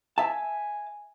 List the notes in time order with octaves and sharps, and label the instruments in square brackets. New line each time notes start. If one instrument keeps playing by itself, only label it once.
[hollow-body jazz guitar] E5 A5 [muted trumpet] G#5